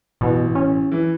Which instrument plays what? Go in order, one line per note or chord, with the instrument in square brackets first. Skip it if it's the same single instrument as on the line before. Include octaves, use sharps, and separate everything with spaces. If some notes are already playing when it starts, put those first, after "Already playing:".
[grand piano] A1 [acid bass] B2
[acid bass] C#4
[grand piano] E3